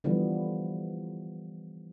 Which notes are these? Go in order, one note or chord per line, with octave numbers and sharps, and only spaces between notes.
D3 E3 F3 G3 B3